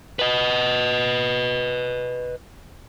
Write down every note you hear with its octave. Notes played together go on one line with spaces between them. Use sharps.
B4 D#5